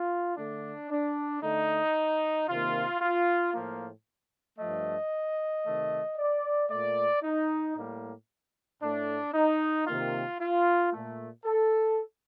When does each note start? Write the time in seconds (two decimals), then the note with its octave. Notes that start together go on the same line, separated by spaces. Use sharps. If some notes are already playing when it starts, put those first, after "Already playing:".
Already playing: F4
0.36 D3 A3 D4
0.90 D4
1.42 D3 A3 D#4
2.48 C3 D#3 A#3 F4
3.00 F4
3.54 A2 F3 A#3
4.59 G2 F3 A3 D#5
5.65 C3 D#3 A3
6.17 D5
6.70 A#2 A3 D5
7.23 D#4
7.75 A2 G3 A#3
8.82 A2 A3 D4
9.34 D#4
9.87 C3 D#3 A#3 F4
10.40 F4
10.93 A#2 A3
11.45 A4